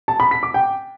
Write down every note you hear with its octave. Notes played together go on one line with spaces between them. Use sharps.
A5
B5
B6
D6
G5